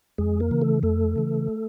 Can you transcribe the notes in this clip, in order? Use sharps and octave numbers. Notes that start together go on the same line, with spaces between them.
F2 G#3 G#4
A#3 A#4
C#3 E3
A3 A4
F2 A3 A4
C#3 E3